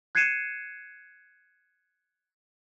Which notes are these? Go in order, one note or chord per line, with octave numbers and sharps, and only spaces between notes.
F#6 G#6 C7 C#7 D#7 E7